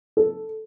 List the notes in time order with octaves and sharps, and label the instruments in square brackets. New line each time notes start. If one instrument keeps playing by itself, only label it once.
[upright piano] A4